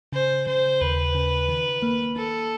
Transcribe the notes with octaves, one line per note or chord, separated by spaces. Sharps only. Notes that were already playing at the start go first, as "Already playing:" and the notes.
C#3 C5
C#3 C5
D#2 B4
C#3
D#3
A#3
A#3 A4